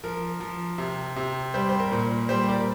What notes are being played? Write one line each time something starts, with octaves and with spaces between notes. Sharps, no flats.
F3 A#4
F3
C3
C3
G3 G4 C5
C5
A#4
A#2
G3 G4 C5
A#4 D5